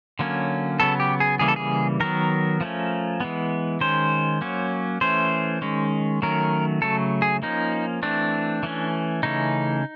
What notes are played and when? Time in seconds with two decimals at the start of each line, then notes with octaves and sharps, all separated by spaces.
0.19 D3 F#3 A#3 C#4
0.80 C#3 F#3 B3 A4
1.00 G4
1.20 G#4
1.39 C#3 E3 G3 A#3 G#4
1.48 A4
1.56 G#4
2.00 D#3 F#3 B3 A#4
2.61 F3 A3 C#4
3.20 E3 G#3 B3
3.81 D#3 G#3 C#4 C5
4.41 F#3 A#3 C#4
5.01 E3 A3 C#4 C5
5.62 D#3 G#3 C#4
6.22 D#3 F#3 A3 C#4 A#4
6.82 C#3 F#3 A3 A4
7.22 G#4
7.42 F3 A#3 C#4 D#4
8.03 E3 A3 C4 D4
8.63 E3 A3 C#4
9.23 C#3 E3 A3 C#4 D#4